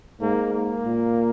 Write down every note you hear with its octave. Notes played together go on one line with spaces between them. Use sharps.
G#2 A#3
A#3
A#2